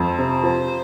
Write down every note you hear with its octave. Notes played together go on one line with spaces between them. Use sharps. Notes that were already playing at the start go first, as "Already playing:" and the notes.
Already playing: F2 C5
C3
F3